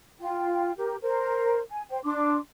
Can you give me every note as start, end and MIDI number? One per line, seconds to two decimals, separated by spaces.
0.21 0.72 65
0.21 0.72 79
0.77 0.96 67
0.77 0.96 70
1.02 1.59 70
1.02 1.59 72
1.70 1.83 80
1.90 1.99 72
1.90 1.99 79
2.05 2.37 62
2.05 2.37 84
2.05 2.37 86